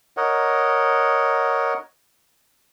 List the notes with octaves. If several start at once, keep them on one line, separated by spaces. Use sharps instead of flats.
A#4 C#5 D#5 F#5